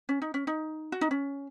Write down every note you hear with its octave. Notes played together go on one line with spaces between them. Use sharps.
C#4
D#4
C#4
D#4
F#4
D#4
C#4